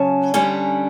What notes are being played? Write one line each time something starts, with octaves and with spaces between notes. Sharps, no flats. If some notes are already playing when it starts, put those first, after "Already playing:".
Already playing: C#3 F#3 C#4 A5
D3 G3 C#4